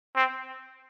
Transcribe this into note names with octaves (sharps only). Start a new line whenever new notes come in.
C4